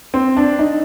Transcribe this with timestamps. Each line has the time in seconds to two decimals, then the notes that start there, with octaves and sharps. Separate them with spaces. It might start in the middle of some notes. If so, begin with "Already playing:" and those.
0.14 C4
0.37 D4
0.59 D#4